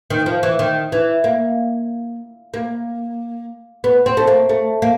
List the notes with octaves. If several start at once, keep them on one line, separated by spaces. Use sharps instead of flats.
D#3
F3
E3
D#3
E3
A#3
A#3
B3
C4
A3
A#3
A3
A#3